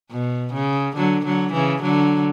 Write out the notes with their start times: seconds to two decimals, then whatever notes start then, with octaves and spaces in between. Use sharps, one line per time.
0.11 B2
0.54 C#3
0.96 D3 F#3
1.25 D3 F#3
1.53 C#3 E3
1.82 D3 F#3